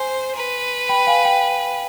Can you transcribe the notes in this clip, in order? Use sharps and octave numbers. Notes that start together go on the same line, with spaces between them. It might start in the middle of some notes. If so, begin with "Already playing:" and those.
Already playing: C5 G#5 C6
B4
G5 B5
F5 G#5
G5